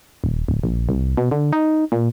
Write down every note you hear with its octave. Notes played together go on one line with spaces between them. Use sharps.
D#1
D1
A#1
C2
B2
D3
D#4
A#2